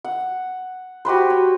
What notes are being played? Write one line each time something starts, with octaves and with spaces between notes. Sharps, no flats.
F#5
F#4 G4 B4 C5
C#5